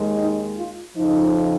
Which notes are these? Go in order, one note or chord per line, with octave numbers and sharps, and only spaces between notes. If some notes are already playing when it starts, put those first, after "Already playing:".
Already playing: D#2 D#3 G#3
D#4
F4
F2 C#3 F3 D#4